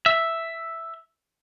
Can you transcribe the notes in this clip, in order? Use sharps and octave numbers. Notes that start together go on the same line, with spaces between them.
E5